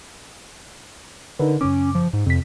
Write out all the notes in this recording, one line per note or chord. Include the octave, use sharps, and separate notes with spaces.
D3 D#4 A#4 B4
F#2 C#3 C#4 D6
F3
G#2
F2 C3 B6